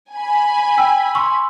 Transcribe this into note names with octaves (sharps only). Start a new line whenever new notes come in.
G#5 B5
G5 E6
C6 C#6 E6